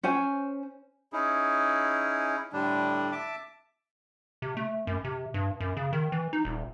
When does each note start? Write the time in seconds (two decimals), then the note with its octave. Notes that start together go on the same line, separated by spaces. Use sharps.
0.03 C#4 C5 G#5
1.13 C#4 D#4 E4 G#4
2.53 A2 D3 G3 D4
3.12 E5 A5 D6
4.42 C3
4.57 A3
4.87 F#2
5.04 C3
5.34 G2
5.60 F#2
5.77 C#3
5.93 D#3
6.12 E3
6.33 D#4
6.45 D#1